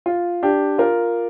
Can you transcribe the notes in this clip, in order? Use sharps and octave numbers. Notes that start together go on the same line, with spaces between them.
F4
D4 G4
F4 A#4